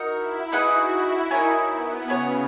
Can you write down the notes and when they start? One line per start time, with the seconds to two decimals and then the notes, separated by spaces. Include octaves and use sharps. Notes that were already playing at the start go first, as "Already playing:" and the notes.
Already playing: D#4 F#4 A#4
0.14 E4
0.52 D#4 F#4 G#4 B4 F#5
0.91 E4
1.31 D#4 A#4 C#5 G#5
1.69 B3
2.08 C#3 F#4 C#5 G#5